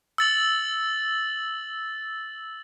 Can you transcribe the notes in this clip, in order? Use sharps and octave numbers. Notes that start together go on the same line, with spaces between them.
E6 A6 F#7